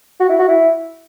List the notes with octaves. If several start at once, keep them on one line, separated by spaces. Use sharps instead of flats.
F#4
E4
F#4
E4